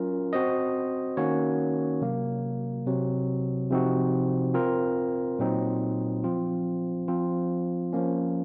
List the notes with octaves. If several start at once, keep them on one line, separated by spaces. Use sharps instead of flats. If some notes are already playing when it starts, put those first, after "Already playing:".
Already playing: F#3 C#4 F4 A#4
C4 F#4 C5 D#5
D#3 A#3 C#4 F#4 C#5
C3 F#3 A#3
C3 F#3 C4
C3 F3 C4 D#4 F#4
C4 F4 A#4
A#2 F#3 C4 D#4
F3 C4 F4
F3 C4 F4
F3 A#3 C#4